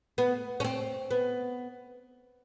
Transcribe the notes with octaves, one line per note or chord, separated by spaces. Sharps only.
B3
C#4
C4
B3